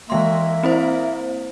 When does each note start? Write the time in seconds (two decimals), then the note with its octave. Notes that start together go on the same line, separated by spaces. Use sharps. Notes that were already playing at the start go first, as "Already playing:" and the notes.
0.10 E3 G#3 A#3 E5 C6
0.63 C4 E4 C5